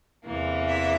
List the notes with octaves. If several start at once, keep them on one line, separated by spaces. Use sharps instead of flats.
E2 C3 E3 A#3
E5